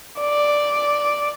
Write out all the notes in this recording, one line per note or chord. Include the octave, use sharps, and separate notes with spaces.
D5